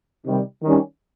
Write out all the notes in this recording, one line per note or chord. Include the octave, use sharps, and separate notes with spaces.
C3 D#3 G3
D#3 G3 C#4